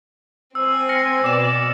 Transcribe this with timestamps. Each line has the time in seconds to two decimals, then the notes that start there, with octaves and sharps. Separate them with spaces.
0.55 C4 C5 G#5 E6
0.89 F6 A#6 C#7
1.24 B2 B3 D5 D6 E7